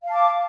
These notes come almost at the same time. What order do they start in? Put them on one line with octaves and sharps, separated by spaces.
F5 A5 D6